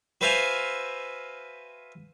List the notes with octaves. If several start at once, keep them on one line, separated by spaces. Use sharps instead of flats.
F#4 B4 C5 E5 F5 G#5